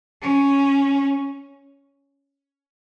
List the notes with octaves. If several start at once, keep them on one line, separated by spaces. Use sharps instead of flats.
C#4